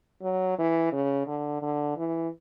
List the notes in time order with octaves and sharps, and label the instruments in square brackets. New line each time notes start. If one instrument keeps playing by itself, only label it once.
[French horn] F#3
E3
C#3
D3
D3
E3